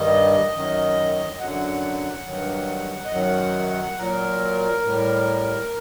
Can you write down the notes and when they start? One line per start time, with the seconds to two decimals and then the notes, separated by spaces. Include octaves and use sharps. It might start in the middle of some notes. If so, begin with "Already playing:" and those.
Already playing: G2 D#3 G3 D#5
0.54 F#2 D#3 F#3
1.33 D#5
1.39 F#2 D3 F#3 F#5
2.25 G2 D#3 F#3
3.05 D#5
3.12 F#2 D#3 F#3 F#5
3.98 A#2 F#3 A#4
4.84 A2 G3